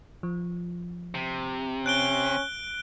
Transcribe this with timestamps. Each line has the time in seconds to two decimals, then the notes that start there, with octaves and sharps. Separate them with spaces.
0.23 F3
1.15 C3
1.86 C#4 F#6 D7 G7